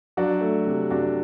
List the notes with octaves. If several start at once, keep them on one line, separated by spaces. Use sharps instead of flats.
F#3 D4 F#4
A3
C3
C3 D4 F#4